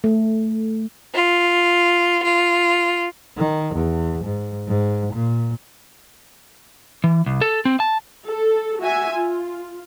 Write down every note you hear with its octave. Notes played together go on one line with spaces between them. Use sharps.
A3
F4
F4
D#3
E2
G#2
G#2
A#2
E3
C2
A4
C4
A5
A4
F#4 E5 G#5
F4